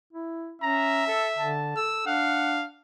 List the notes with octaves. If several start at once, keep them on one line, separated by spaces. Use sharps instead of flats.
E4
C#4 E5 A#5
A4
D3 A5
A4 E6
D4 F5 F#5